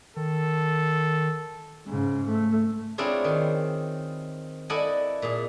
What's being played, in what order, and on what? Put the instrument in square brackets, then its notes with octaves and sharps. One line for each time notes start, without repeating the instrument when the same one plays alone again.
[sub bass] D#3 [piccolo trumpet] A4
[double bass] G#2 C#3
A3
[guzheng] C4 D4 E4 F4 G#4 C#5
D#3
E4 A4 D5 D#5 F#5 G#5
A#2 G#4